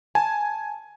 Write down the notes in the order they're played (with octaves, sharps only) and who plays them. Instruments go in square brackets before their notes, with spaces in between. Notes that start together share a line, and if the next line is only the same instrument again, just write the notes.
[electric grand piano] G#5 [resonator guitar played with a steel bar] A5